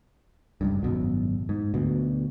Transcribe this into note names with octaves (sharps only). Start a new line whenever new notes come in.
F#1 C#2 G2
G#1 F#2 B2 F#3
G#2
D2 B2